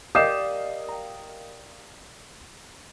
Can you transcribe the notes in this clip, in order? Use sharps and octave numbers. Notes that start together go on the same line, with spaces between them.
G4 A#4 D5 D#5 F5 D#6 C7 E7
G5 A#5